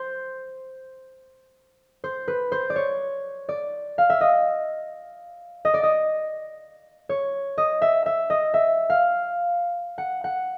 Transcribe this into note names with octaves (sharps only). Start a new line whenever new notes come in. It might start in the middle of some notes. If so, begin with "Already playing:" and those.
Already playing: C5
C5
B4
C5
D5
C#5
D5
F5
E5
D#5
D#5
D5
D#5
C#5
D#5
E5
E5
D#5
E5
F5
F#5
F#5